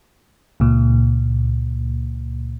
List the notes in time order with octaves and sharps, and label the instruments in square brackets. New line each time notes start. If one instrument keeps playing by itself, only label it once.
[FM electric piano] C#2 A#2